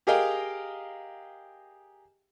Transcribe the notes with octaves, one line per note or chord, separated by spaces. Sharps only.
G4 G#4 A#4 D#5 F5 G5